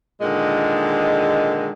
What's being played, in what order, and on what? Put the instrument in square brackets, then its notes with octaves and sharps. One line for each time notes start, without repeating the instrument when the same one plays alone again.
[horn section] A#2 D3 D#3 G#3